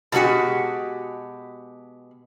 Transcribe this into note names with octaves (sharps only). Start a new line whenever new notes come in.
B2 F#3 G#3 F#4 G4